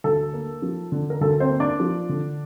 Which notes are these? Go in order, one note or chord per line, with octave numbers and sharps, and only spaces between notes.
D2 A4
A#3
F3
D3
A#4
D2 A4
C4 C5
A#3
D4 D5
F3
D3